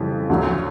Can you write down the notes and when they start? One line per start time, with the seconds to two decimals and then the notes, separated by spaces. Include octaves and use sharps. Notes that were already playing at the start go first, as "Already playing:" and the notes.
Already playing: F2 C#3 E3 G3
0.30 D2 D3 F#3